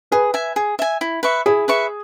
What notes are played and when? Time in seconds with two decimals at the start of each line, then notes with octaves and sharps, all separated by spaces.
0.12 G#4 B4
0.34 E5 G#5
0.56 G#4
0.79 E5 G#5
1.01 E4
1.23 B4 E5 C#6
1.46 E4 G#4
1.68 B4 E5 C#6